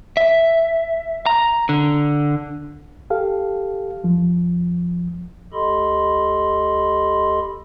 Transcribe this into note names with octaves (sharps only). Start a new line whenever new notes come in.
E5
A#5
D3
G4 A4 F5
F2 F3
D2 G4 A4 D#5 B5 C6